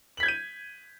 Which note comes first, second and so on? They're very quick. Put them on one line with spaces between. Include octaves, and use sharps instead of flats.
F#7 B6 G#6 G6 D#7